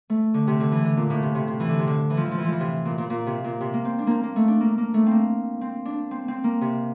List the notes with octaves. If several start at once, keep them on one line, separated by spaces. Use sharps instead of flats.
A3
D3
C3
D3
E3
D3
A#2
A2
C3
C3
C3
E3
D3
C3
D3
E3
F3
E3
F3
E3
F3
E3
C3
A#2
A#2
A#2
C3
A#2
C3
A#3
C4
D4
A#3 C4
A#3
A3
D4
A#3
A#3
A3
A#3 C4
C4
D4
C4
C4
A#3
C3